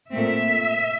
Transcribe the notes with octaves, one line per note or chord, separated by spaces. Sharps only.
A#2 A3 C4 E5